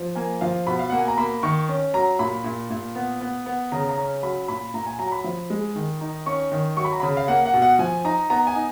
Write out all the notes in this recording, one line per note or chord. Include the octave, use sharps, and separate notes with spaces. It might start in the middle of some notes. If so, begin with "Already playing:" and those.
Already playing: F3
A#3 G#5
F3 F5
B2 B5
F5
A#3 F#5
G#5
A#5
A#3 B5
D#3 C#6
C#4
F#3 A#5
A#2 B5
A#2
A#2
B3
B3
B3
C#3 A#5
A#5
C#4
F#3 B5
A#2 B5
A#2 A#5
G#5
F#3 A#5
B5
F3
G#3
D#3
D#4
C#4 C#6
D#3
F#3 C#6
B5
A#5
C#3 B5
F5
A#3 F#5
F#5
B2
F#5
F3 G#5
D#4 A#5
B3 A#5
G#5
D#4